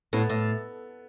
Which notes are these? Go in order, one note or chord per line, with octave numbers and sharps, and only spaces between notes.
A2 B3
A2